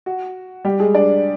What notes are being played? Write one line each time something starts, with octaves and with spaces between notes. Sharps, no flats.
F#4
G3 G4
G#3 G#4
D4 D5